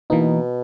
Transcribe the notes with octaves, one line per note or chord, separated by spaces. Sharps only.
B2 E3 A#3 D#4